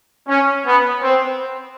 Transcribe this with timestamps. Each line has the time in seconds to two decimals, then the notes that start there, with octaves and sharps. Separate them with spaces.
0.28 C#4
0.66 B3
1.03 C4